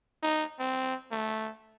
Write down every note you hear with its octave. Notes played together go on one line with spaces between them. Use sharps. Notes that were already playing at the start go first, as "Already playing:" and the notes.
D#4
C4
A3